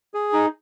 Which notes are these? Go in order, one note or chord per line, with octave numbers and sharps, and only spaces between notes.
G#4
D#4